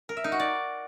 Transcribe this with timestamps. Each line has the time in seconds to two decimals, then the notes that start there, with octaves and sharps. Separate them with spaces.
0.09 A#4
0.17 E5
0.24 D#4
0.32 F#4
0.40 D5